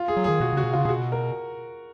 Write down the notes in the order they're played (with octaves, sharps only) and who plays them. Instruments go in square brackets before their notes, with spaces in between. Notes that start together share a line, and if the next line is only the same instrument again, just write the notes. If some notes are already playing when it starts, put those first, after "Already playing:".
Already playing: [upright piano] F4
G#4
[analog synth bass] F#3
[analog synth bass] D#3 [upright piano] G#4
[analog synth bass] B2 [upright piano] F#4
[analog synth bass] C#3 [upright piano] F#4
[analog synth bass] B2
[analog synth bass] C#3 [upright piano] F4
[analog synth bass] B2 [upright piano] F#4 G#4
[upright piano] A#4